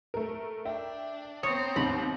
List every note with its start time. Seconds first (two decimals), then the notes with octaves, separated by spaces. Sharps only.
0.14 A3 A#4
0.65 D4 E5 G5
1.43 B3 C4 C#5 A#5 D#6
1.76 D#2 G#2 C3 B5